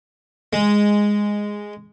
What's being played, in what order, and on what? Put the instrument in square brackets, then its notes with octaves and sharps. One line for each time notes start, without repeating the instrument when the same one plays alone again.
[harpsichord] G#3